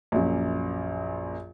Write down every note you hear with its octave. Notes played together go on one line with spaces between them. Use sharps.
A#1 F#2